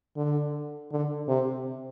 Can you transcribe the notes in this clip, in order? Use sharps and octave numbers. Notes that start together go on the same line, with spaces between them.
D3
D3
C3